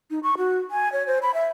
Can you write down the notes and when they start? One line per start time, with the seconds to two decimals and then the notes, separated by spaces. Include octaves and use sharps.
0.11 D#4
0.23 C#6
0.38 F#4
0.71 G#5
0.93 C#5
1.07 C5
1.22 B5
1.34 E5